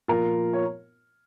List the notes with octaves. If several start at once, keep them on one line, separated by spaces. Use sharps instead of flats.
A#2 F3 F4 A#4
C#5